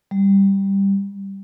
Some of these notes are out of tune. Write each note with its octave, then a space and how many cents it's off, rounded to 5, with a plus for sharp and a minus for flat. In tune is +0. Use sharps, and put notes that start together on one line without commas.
G3 +5